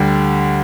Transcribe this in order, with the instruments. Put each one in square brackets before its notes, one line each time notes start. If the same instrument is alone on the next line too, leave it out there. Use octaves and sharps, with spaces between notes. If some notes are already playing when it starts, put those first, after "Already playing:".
Already playing: [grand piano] D2 D3 G3